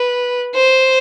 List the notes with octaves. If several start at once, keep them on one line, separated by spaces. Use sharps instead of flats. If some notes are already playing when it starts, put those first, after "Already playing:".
Already playing: B4
C5